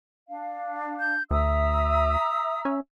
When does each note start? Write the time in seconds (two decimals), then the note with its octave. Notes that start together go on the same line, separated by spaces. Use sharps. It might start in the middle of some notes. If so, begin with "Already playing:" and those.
0.29 D4 F5
1.00 G6
1.31 D2 E5 A#5 D#6 E6
2.65 C#4